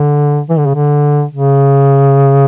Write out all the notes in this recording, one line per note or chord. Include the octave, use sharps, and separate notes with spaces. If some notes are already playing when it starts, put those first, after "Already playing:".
Already playing: D3
E3
D3
C#3
D3
C#3